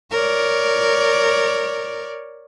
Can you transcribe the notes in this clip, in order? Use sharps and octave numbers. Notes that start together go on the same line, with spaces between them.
A#4 C#5 D5